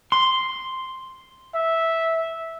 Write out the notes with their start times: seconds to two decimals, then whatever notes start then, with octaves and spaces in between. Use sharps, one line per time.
0.12 C6
1.54 E5